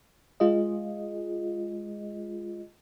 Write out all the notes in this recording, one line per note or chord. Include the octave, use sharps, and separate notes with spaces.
G#3 F4 G#4 D#5